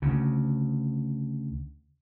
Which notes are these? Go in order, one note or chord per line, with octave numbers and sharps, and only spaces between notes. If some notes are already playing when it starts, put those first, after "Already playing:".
D2 C#3